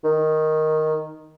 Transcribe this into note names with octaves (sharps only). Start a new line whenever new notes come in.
D#3